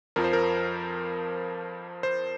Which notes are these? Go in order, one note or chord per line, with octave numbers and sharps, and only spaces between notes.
F2 F3 A#4
C5
A#4
C5